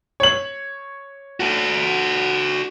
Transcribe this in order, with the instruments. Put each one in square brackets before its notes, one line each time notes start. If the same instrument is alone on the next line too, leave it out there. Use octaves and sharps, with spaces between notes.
[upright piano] C#5 F#7
[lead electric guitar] F#4 A4